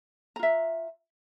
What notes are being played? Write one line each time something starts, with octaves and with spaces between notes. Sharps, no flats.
F4 E5 A#5